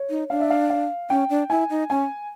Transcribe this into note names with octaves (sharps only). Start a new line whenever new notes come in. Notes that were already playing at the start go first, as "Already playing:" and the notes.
Already playing: C#5
D#4
D4 F5
E5
F5
F5
C#4 G5
D4
E4 G#5
D#4
C#4 G#5